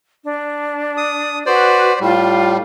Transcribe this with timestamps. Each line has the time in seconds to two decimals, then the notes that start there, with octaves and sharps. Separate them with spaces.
0.23 D4
0.97 D#6
1.46 F#4 B4 C5 D5
2.00 A2 G3 F4